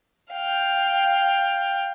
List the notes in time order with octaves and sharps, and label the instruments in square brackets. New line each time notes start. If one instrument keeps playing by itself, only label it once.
[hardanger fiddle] F5 G5